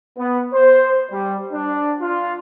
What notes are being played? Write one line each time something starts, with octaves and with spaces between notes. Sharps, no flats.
B3
C5
G3
D4
F4